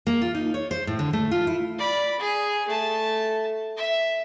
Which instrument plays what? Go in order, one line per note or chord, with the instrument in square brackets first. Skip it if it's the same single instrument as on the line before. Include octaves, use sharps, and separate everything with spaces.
[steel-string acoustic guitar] A#3
F4
D#4
C#5
C5
A2
D3
A3
F4
E4
[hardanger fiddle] D5 B5
G#4
A3 A5
E5